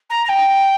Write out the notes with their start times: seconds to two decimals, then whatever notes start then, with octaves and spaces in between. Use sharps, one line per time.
0.09 A#5
0.25 A#5
0.28 G5